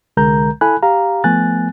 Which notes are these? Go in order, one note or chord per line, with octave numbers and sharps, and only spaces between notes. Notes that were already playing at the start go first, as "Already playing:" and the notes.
C2 D3 G#3 A#4 A#5 G6
E4 A4 G#5 B5 F#6
G4 F5 A#5
F3 A3 B3 G#5 F#6 A6